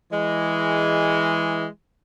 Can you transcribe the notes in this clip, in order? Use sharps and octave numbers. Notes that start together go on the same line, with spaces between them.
E3 G#3